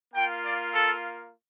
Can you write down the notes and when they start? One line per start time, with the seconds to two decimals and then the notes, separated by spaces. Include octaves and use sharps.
0.14 A#3 F4 G5
0.44 D5
0.73 A4